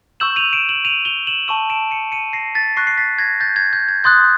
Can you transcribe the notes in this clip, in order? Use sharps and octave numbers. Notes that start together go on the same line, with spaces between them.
C#6 E6 G6 E7 F#7
D#7 F7
D7 E7
E7 F#7
D#7 F7
F7 G7
E7 F#7
A5 C#6 E6 D#7 F7
D7 E7
C#7 D#7
C#7 D#7
A#6 C7
A6 B6
C#6 F#6 A#6 C7
C7
A6 B6
G#6 A#6
G6 A6
G#6
G6
G#6
C6 D#6 F#6 G6 A6